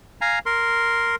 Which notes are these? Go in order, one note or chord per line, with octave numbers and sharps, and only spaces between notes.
F5 G#5 A#5
A#4 C6